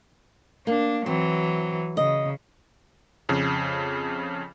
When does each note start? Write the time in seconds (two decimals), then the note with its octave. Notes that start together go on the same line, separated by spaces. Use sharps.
0.67 A#3 D4
1.06 E3 F#3 C4
1.97 C#3 D#5
3.29 F2 C#3